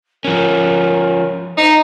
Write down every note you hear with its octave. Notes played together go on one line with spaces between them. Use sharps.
F3 C#4 A#4
D#4 C5